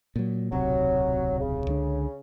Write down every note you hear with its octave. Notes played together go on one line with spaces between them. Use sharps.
A#2 F#3
D1 B1 C3 F#3
C#3
C#2 D3 D4